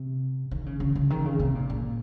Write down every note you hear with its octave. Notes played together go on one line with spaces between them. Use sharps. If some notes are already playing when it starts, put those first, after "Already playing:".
Already playing: C3
D#3
C#3
C#3
C#3
D#3
C#3
C3
A#2
A#2